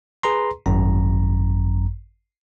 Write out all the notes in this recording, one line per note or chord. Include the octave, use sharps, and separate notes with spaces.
G#4 B4 A#5 C6
G#1 F#2 A#5